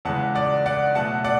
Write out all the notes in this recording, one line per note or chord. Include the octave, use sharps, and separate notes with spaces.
E2 C#3 G#3 F#5 A5
D5 F#5
D5 F#5
B2 F#3 A3 F#5 A5
D5 F#5